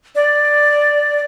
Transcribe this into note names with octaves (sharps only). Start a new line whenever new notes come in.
D5